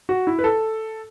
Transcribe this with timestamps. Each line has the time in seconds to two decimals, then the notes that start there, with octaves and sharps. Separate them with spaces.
0.09 F#4
0.27 E4
0.39 B4
0.44 A4